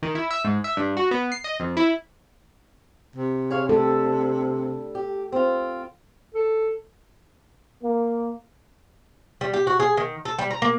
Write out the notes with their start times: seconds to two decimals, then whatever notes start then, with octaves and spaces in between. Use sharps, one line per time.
0.03 D#3
0.15 E4
0.31 E5
0.45 G#2
0.64 E5
0.77 G2
0.97 F#4
1.11 B3
1.32 C7
1.44 D#5
1.60 F2
1.77 E4
3.16 C3
3.51 G#4 C#5 F5
3.69 G3 D4 A4
4.95 G4
5.32 C4 F4
6.34 A4
7.82 A#3
9.41 G3
9.53 G4
9.67 F#4
9.80 G#4
9.97 D#3
10.25 A4
10.39 G3
10.50 A#5
10.62 A#3